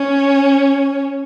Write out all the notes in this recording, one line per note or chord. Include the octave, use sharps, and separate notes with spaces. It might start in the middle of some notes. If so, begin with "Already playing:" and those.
Already playing: C#4